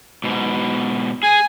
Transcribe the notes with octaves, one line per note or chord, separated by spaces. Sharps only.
G#2 B2
G#4 G#5